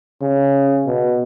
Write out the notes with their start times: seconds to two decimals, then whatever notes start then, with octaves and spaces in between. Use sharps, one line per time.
0.22 C#3
0.86 B2